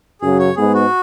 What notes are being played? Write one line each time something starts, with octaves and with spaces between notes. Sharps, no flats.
F#2 C#3 F#3 G#4
C#5
G#2 G#3 B3 G#4
F#4